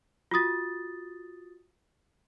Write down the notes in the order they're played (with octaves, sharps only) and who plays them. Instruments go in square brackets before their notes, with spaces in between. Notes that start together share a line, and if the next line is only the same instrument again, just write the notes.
[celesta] F4 F#4 D#6 A6